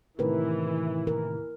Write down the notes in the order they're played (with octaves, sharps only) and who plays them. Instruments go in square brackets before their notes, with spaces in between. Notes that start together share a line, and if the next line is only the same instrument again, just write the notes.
[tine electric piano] A2 C3 D#3 [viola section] E3 [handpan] A#4 B4
[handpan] A#4